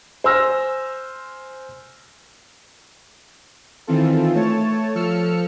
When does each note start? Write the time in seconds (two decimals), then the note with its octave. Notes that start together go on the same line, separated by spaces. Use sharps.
0.24 C5 G#5 C6 E6 F6 A#6
3.87 D#3 E3 C4 F4 A4
4.35 A3 C#5 A5
4.95 F3 A4 E6 F6 C#7